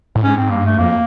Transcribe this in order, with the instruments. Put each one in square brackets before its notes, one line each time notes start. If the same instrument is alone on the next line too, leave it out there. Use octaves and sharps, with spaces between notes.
[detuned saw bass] A2
[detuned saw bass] G#2 [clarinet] C#4
[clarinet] C4
[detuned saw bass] G2 [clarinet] A#3
[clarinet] A3
[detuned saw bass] F2 [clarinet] A#3